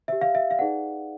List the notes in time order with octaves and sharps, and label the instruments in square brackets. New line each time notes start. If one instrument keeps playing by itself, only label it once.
[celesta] G4 C5 E5
F5
E5
F5
D#4 G#4 B4 D5 F#5